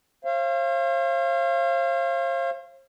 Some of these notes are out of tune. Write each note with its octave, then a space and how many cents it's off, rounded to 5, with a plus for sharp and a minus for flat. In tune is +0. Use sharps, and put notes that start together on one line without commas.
C5 +45 F5 -30